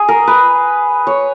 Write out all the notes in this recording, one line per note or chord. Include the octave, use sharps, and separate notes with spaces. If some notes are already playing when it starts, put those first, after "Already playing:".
Already playing: G#4
A#4
B4
C#5